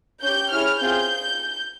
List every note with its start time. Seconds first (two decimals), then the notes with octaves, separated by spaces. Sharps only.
0.23 C#4 G4 G6
0.52 C#4 E4 G#4 F6
0.80 C4 F4 G#4 G6